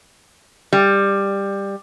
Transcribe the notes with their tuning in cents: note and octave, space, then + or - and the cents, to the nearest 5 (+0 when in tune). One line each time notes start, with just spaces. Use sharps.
G3 +15